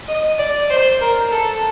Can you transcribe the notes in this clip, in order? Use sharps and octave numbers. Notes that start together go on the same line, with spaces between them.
D#5
D5
C5
A#4
A4